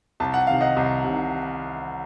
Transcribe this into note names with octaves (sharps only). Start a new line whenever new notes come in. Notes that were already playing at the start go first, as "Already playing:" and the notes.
C2 A5
F#5
C3 D#3 F5
D#5 F#5
C2
C3 D#3